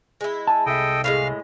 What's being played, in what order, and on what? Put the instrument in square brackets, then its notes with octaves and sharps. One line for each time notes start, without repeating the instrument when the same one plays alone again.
[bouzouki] G#3 E4
[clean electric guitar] G#5 A5
[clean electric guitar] C2 E5 [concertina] A4 D#5 G5
[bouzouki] A2 D3 G#3 [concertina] F5 F6